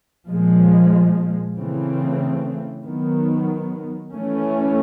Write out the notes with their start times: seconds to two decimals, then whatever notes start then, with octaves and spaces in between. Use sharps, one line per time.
0.28 A#2 F3 G#3
1.56 C#3 E3 A3 C4
2.84 D#3 F#3 B3
4.12 E3 A3 C#4